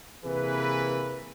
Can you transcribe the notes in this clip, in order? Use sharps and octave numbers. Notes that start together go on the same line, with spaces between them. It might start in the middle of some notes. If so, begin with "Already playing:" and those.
C3 E3 A#3 G#4 B4